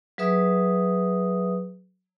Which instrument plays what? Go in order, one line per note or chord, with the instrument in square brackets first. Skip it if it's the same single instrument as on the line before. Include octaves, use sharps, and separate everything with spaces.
[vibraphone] F#3 G#4 B4 E5 D#6